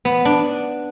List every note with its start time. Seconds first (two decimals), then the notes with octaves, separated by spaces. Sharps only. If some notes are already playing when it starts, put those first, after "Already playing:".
0.05 B3
0.25 D4